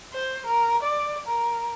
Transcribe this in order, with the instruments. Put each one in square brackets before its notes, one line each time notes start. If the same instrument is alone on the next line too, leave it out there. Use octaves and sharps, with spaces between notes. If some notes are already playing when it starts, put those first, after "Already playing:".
[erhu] C5
A#4
D5
A#4